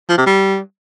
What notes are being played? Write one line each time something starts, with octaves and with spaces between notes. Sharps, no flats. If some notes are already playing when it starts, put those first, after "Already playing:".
F3
C3
G3